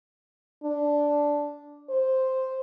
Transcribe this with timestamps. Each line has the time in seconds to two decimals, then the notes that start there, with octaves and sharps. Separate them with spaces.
0.63 D4
1.89 C5